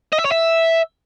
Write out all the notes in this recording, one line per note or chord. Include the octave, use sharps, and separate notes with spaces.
D#5
E5
C#5
E5